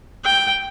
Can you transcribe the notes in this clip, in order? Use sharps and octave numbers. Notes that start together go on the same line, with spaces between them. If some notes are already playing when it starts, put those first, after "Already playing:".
G5